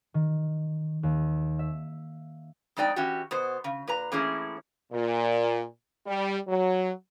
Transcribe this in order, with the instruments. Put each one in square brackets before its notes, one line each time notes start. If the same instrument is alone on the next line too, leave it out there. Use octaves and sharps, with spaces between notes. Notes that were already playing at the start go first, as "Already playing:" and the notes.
[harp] D#3
D#2
E5
[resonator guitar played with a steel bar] F2 G#3 D#4 D5 G5
E3 C#4 F#4 G4
B2 B3 C5
C#3
A#2 B4 A#5
A2 E3 A#3 C#4 E4 G#4
[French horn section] A#2
G3
F#3